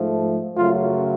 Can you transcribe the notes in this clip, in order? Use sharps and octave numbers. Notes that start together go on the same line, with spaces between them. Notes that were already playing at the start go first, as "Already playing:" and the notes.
Already playing: G#2 F3 A3
F#2 C#3 F#3 A3 F4